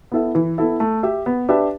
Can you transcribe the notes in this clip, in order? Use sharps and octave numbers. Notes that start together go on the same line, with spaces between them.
B3 E4 A4 E5
E3
B3 E4 A4 E5
A3
G4 E5
B3
D4 G4 B4 E5